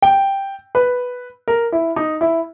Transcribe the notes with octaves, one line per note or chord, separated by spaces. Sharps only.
G5
B4
A#4
E4
D#4
E4